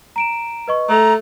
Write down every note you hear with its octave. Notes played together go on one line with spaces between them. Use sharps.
A#5 D7 E7
B4 D#5 C#6
A3 A4 A#5 F7